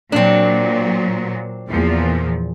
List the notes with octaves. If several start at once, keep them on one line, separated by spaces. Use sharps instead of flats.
A#2 F#3 C4 D4
E2 A#2 F3